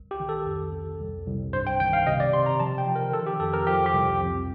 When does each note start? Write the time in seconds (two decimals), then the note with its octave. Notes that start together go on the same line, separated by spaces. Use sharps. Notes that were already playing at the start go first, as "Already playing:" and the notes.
Already playing: C2
0.11 G4
0.20 D#3
0.29 A4
0.46 F2
0.73 F2
1.00 C2
1.26 C2
1.53 G2 C5
1.67 G5
1.80 D#3 G5
1.93 F5
2.06 C3 D#5
2.20 D5
2.33 C3 C6
2.46 A#5
2.60 F3 A5
2.78 G5
2.86 F3
2.95 A#4
3.13 D#3 A4
3.27 G4
3.40 F2 A4
3.53 A#4
3.67 F3 G4
3.86 G4
3.94 C2
4.20 F2